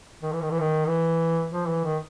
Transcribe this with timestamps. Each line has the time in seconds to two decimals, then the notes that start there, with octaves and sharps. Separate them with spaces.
0.23 D#3
0.32 E3
0.41 D#3
0.51 E3
0.60 D#3
0.87 E3
1.52 F3
1.68 E3
1.84 D#3